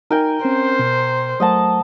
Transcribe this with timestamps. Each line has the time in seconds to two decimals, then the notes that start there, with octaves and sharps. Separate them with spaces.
0.11 D#4 A#4 G5 G#5
0.45 C4 C#4 C5
0.79 B2
1.40 F#3 A3 C5 D#5 F#5 A5